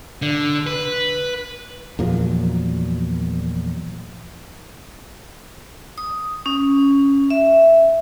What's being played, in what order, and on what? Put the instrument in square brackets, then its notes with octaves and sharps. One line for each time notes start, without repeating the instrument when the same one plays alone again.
[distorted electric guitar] D3
B4
[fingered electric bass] E2 A#2 F3 F#3
[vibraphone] D#6
C#4
E5